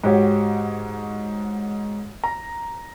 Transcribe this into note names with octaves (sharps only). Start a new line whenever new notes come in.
G#2 F#4 G4 C#5
A#5